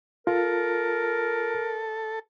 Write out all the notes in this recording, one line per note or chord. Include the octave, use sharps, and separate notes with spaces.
F4 A4 A#4